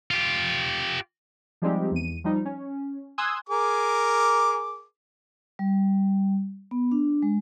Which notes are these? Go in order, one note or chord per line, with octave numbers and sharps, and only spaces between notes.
F4 G4
F3 G3 G#3 C4 D#4 G4
E2 D#7
F3 G3 D#4
C#4
G#5 C6 D#6 E6 F#6 G#6
G#4 A#4 D6
G3
B3
D4
G#3